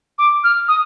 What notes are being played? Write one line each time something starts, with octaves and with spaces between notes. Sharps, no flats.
D6
F6
D#6